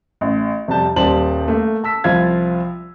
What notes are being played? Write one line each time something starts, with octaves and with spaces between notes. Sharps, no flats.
A1
F2 C3 G3 A5 G6
D#1 G3 C5 A5 F#7
A3 A#3
A5 E6 B6
C2 F3 F4 F5 G#6